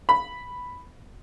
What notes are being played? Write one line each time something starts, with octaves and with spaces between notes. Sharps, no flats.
B5